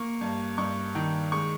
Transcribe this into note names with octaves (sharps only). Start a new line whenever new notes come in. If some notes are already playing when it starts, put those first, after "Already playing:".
Already playing: A#3 C#6
G2
G2 C#6
D#3
G#3 C#6